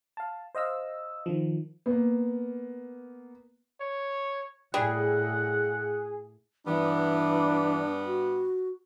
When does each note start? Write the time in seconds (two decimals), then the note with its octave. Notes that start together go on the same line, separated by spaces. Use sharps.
0.17 F5 A5
0.55 C5 D#5 F5 E6
1.26 D#3 F3
1.86 A#3 B3
3.81 C#5
4.74 A2 G3 G#4 F#5
6.66 G2 E3 G3 B3 D4
8.06 F#4